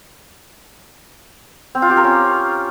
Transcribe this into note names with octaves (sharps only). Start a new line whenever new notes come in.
C4
F4
G4
A#4
C#4